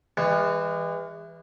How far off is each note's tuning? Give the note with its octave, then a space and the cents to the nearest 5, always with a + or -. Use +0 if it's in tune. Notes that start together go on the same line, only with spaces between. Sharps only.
E3 +0 G#3 -40